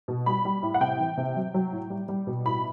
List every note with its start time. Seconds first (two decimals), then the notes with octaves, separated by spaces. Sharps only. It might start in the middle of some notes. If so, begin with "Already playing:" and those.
0.08 B2
0.26 G3 B5
0.45 G3
0.63 A2
0.74 F#5
0.80 C3 G5
1.00 E3
1.18 C3
1.36 F#3
1.54 F#3
1.72 A2
1.90 G3
2.09 G3
2.27 B2
2.45 A2 B5